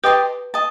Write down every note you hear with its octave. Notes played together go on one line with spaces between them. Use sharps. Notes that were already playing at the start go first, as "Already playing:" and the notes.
G4 B4 D#5 A5 C6
D#5 A5